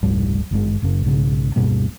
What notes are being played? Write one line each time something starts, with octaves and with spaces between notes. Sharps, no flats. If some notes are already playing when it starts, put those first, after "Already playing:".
F1 C#2 G#2 G3
G#1 G2 E3 G#3
F#1 F#2 C#3
B1 G#2 C#3
D1 G2 B2 A#3